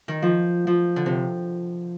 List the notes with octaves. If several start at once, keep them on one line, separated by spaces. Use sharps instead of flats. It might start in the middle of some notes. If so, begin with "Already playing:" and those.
D#3
F3
F3
D3
C3